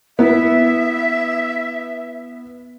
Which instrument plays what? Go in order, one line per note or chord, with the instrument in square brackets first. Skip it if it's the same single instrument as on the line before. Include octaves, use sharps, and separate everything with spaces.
[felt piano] B3 E4 [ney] E5